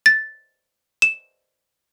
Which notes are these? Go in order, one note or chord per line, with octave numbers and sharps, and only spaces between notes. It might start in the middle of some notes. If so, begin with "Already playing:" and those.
A6
E7